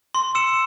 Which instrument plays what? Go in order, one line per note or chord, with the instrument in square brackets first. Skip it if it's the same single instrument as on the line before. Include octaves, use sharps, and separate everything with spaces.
[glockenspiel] C6
E6 C#7 E7